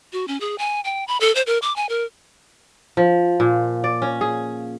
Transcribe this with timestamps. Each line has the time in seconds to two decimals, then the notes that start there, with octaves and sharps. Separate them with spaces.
0.13 F#4
0.28 C#4
0.40 G#4
0.58 G#5
0.85 G5
1.08 B5
1.21 A4
1.35 C5
1.47 A#4
1.62 D6
1.76 G#5
1.89 A#4
2.97 F3
3.40 A#2
3.84 D5
4.02 C#4
4.21 G#4